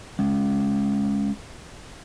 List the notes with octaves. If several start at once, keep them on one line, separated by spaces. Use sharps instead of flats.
G#3 C#4